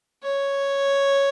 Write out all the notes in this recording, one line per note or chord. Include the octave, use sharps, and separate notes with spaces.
C#5